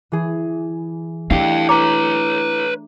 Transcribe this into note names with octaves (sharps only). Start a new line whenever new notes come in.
E3 G#4
A3 D4 E4 G4 F5 G5
B4 C#5 A#5 D6